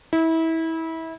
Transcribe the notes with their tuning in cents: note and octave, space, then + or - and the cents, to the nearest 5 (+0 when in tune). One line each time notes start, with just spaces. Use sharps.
E4 -25